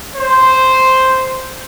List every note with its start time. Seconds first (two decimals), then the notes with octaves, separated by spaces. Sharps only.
0.15 C5